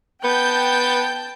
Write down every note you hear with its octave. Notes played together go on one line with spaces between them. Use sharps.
B3 G5 A5 G6